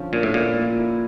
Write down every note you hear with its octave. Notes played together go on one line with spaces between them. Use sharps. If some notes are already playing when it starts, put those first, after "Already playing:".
Already playing: D3 F3 C#4
A#2 F4
A2
A#2 E4
A#3
E4